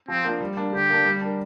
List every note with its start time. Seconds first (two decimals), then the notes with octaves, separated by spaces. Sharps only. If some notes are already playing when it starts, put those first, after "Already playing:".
0.08 F3 C4
0.24 A#3 D4 F4
0.40 G3
0.57 A#3 D4
0.73 D3 G4
0.90 A#3 D4
1.05 G3
1.22 D4 A#4